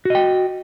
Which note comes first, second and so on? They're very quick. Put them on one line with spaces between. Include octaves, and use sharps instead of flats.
F#4 D#5 G5